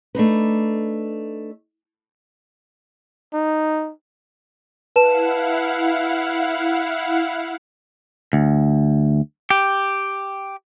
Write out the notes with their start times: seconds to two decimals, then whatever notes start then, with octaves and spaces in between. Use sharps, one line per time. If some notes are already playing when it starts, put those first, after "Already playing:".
0.15 A3 D4 D#4 B4
3.34 D#4
4.96 E4 B4 F5 F#5 A5 E7
8.33 D2
9.50 G4